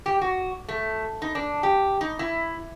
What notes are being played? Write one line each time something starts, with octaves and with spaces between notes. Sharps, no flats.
G4
F#4
A3
D#4
D4
G4
D#4
E4